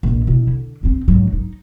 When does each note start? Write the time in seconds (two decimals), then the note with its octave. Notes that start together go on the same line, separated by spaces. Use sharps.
0.03 A#1 A#2
0.27 B2 E4
0.47 D3
0.83 G1 C4
1.08 G#2 F#3
1.33 D#4